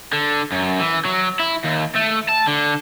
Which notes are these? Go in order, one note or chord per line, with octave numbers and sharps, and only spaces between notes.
D3
F#2
E3
F#3
E4
D#2
A3
A5
D3